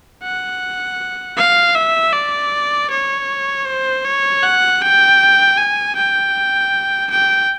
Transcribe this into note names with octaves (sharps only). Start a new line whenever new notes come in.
F#5
F5
E5
D5
C#5
C5
C#5
F#5
G5
G#5
G5
G5